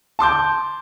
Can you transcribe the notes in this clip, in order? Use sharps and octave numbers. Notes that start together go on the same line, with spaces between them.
A5 C6 D6 G6